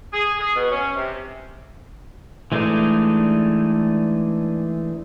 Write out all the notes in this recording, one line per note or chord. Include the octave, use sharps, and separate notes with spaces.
G#4
G#4
B2
C#4
C3
E3 G#3 A3 D4 D#4